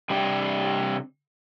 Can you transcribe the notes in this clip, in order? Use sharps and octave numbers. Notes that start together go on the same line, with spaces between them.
C3 G3 D4 G4